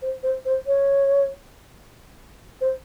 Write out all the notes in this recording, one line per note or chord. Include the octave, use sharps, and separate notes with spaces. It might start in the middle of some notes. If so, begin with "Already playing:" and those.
C5
C5
C5
C#5
C5